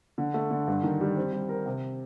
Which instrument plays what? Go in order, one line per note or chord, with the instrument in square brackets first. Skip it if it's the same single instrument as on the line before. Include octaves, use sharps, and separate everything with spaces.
[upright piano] D3
A3
D3
G2
D#3
G3
C4
G3
A#4
C3